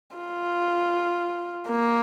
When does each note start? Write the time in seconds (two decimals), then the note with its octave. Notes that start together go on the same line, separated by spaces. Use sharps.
0.16 F4
1.68 A#3